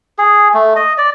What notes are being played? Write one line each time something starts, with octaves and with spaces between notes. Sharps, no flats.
G#4
A3
D#5
D5